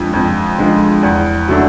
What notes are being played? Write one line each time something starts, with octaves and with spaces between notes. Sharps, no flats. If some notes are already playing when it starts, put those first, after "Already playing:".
Already playing: F2 D3 F3 G#3
F2
D3 F3 G#3
E2
C#3 F#3 A3 D4